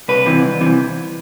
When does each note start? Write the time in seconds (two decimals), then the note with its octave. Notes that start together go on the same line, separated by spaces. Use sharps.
0.08 C2 B4
0.26 C3 E3
0.44 C2
0.61 C3 E3